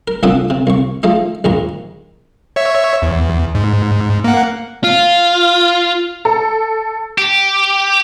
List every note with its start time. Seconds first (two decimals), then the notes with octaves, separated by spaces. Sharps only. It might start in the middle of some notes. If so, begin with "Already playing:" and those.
0.08 A#4
0.23 C2 A#2 D4 A4 F#5 D#6
0.50 C3
0.67 C2 C#6
1.03 F3 G#3 A3 D#4
1.44 A#1 D#2 G#2 A#5
2.56 C#5 E5
3.02 E2
3.55 G#2
4.24 A#3 F#5
4.84 F4
6.25 A4
7.18 G4